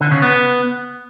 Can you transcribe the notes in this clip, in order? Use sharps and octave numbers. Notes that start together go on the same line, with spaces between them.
D3
C#3
B3